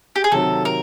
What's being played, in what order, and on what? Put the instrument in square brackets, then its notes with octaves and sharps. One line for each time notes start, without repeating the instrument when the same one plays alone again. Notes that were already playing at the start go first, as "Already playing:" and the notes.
[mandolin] G4
G#4
[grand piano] C3 D#3 F#3 [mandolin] A4
[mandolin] A#4